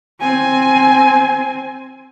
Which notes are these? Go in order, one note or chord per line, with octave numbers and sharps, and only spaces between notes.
C4 G#5